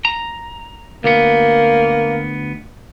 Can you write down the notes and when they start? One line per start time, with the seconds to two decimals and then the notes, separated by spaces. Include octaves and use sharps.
0.05 A#5
1.04 D2 A#3 B3